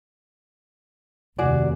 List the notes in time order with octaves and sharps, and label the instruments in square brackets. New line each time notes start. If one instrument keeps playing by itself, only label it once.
[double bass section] F1 D#2 [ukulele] F#4 G#4 D5